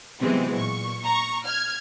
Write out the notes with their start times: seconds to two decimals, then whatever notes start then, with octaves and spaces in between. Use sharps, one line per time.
0.21 C3 E3 F#3 G#3 B3 C4
0.58 A#2 C#6
1.06 A#5 C#6
1.44 F6 G#6